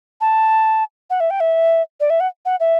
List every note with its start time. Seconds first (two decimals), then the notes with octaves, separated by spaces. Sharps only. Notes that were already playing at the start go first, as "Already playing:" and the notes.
0.21 A5
1.10 F#5
1.20 E5
1.30 G5
1.40 E5
2.00 D5
2.10 E5
2.20 F#5
2.45 F#5
2.60 E5